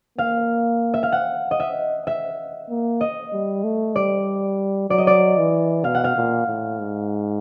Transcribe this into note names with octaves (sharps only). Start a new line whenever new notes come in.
A#3 F5
E5
F5
F#5
D#5
E5
E5
A#3
D#5
G3
A3
G3 D5
F#3 D5
D#5
D5
E3
B2 F5
F#5
F5
A#2
A2
G#2